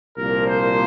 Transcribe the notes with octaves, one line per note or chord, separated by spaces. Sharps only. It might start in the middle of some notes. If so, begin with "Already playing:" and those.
C2 A#2 F3 A#3 A#4
C5